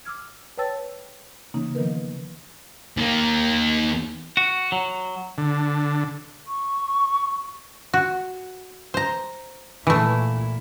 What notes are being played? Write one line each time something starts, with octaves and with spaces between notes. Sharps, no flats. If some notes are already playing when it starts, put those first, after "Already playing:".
D6 E6 F6 G#6
B4 C#5 G5 A5 E6 A6
C#3 E3 A#3 C#4 D#4
D#3 F3 B3 A#4 B4
D#2 A#3
F#4
F#3
D3
C#6
F#4
C5 A#5
A#2 E3 A3 E4